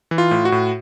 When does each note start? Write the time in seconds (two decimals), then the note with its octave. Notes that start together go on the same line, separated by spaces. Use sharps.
0.11 E3
0.18 F4
0.31 A2
0.45 F#4
0.52 A2